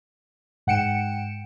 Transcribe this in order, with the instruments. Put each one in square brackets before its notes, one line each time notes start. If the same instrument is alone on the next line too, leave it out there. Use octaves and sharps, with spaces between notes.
[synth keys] G#2 F#5 G5 C#7 D7 E7